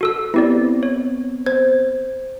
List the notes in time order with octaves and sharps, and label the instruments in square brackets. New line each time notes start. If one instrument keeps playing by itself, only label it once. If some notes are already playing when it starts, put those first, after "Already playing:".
[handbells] F#4 A4 E6
[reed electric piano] B3 C4 [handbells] E4 G4 D5
[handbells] C#5
[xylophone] C5 [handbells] G#6